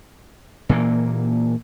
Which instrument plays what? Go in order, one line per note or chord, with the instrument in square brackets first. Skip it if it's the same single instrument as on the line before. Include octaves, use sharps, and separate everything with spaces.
[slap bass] A#2 E3 A#3